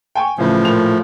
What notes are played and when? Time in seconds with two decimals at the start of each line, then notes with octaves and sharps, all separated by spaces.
0.15 G5 G#5 C#6
0.38 A2 C#3 E3 F3
0.65 A#2 E4 F7